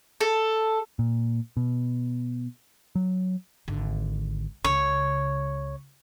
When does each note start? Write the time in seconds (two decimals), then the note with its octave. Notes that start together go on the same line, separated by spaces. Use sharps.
0.21 A4
0.99 A#2
1.57 B2
2.96 F#3
3.68 G#1 D3
4.64 C#2 C#3 C#5